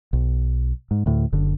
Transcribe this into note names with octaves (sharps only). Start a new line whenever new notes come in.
B1
G#2
D2 A2
F#1 D3